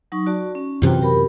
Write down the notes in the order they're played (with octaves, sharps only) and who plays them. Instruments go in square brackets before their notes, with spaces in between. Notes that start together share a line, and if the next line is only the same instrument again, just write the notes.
[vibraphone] F#3 D#4 C#6
F#4 D5 A5
C#4
[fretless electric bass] F#2 C3 E3 [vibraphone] F4 F#4 G5
[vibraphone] G4 A#4 B5